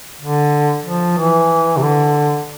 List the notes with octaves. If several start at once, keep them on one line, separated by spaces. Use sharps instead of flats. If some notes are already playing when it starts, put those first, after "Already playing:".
D3
F3
E3
C3
D3